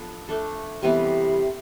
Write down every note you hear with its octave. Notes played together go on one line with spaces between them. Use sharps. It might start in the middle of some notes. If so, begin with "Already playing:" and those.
Already playing: F3 B3 D4 A4
A3 D4 A4
C3 E3 G3 B3